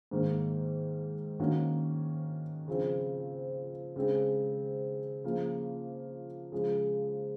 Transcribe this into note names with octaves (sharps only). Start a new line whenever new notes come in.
G#2 D#3 A#3
D#3 A#3 C#4 F#4
C#3 F3 C4
C#3 G#3 C4
C#3 F3 A#3
C#3 F3 G#3